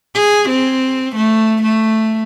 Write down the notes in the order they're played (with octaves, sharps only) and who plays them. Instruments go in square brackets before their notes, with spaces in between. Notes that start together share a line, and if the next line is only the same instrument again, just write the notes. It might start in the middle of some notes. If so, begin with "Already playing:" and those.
[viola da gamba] G#4
C4
A3
A3